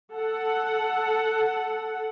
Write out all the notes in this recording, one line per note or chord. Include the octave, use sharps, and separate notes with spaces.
A4 F#5